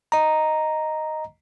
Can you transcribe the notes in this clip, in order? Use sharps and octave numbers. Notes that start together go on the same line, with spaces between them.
D#5 A#5